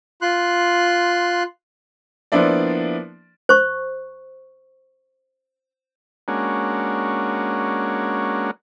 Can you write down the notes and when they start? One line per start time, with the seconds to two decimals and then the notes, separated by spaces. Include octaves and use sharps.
0.22 F4 C6 F#6
2.32 F3 A#3 B3 D4 E4 D5
3.49 C5 C#6
6.28 G#3 A#3 C#4 D4 F#4